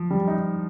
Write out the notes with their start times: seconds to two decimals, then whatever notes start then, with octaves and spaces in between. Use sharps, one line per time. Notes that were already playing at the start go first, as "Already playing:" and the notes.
Already playing: F3
0.11 G3
0.28 D#4